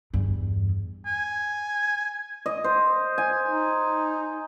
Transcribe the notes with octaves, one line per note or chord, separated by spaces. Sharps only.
E2 G2
G#5
D#5
C5
G#5
D#4